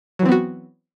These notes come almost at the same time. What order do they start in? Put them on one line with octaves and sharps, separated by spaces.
F#3 E3 C4 B3 F#4